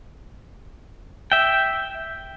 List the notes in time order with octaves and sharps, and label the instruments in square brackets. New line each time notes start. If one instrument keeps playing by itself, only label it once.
[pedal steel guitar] E5 G5